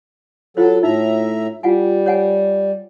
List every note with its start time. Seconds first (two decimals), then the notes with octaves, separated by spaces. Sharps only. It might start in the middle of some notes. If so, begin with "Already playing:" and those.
0.57 F#3 F4 A4 C5
0.83 A2 D#4 E5 A#5
1.63 G3 F4 F#5 G#5
2.06 C#5 F#5 G#5